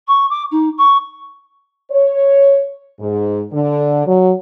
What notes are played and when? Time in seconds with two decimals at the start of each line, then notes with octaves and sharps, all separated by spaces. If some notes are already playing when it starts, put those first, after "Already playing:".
0.07 C#6
0.29 D6
0.51 D#4
0.77 C#6
1.91 C#5
3.00 G#2
3.52 D3
4.05 F#3